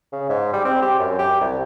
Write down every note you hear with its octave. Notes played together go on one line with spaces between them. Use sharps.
C#3
G#2
G3
C4
G4
F#2
G4
C2